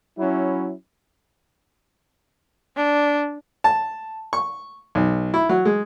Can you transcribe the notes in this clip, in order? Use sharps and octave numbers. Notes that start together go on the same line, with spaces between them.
F#3 C#4 E4
D4
A5
C#6
B1
E4
F#3
G#3